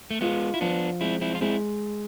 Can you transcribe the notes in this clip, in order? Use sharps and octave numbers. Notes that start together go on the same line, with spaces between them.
A3
G#3 B3 F4
E4
F3 B3 D4
G#3 C4 E4
C4 E4
F4
G#3 C4 E4